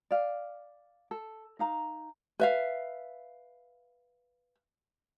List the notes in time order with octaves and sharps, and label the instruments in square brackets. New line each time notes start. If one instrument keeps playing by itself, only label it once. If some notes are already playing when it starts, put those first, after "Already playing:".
[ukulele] D5 F5
A4
D#4 F5 A#5
B4 E5 F5